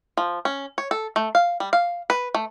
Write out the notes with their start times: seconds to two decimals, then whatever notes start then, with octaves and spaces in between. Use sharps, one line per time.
0.17 F3
0.45 C#4
0.78 C#5
0.91 A4
1.16 A3
1.35 F5
1.60 G3
1.73 F5
2.10 B4
2.34 A3